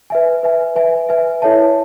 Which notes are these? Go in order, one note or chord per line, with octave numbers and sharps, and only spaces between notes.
B4 E5 G#5
B4 E5 G#5
B4 E5 G#5
B4 E5 G#5
E4 A4 C#5 E5 A5